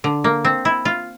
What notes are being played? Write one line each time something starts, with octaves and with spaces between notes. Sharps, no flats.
D3
A#3
C4
E4
F4